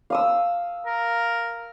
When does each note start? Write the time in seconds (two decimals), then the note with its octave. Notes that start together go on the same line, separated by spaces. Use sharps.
0.10 F5 D#6 E6
0.86 A#4